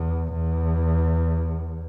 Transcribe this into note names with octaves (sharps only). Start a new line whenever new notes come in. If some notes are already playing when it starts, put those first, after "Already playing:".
Already playing: E2
E2